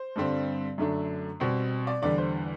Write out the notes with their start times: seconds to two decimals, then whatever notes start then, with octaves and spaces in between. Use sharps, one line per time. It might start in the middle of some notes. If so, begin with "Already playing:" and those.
Already playing: C5
0.16 G2 D3 G3 C4
0.78 F#2 D3 A3 D4
1.40 B2 G3 C4
1.87 D5
2.02 E2 D3 G3 D5
2.18 C5